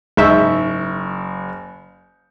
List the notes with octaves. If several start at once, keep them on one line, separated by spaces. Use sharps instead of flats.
F#1 G#2 D#4 E5 C#6 G6